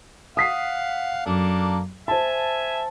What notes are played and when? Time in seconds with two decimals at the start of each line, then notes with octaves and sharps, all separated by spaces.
0.37 F5 F#5 D#6 B6 C7
1.26 F#2 A#3 D4 A4
2.08 C5 E5 G#5 A5